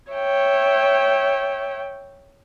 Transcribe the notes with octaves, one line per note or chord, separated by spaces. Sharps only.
C#5 E5 G5